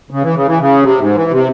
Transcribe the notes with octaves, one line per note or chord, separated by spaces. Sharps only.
C#3
E3
C#3
E3
C#3
C3
G#2
E3
C3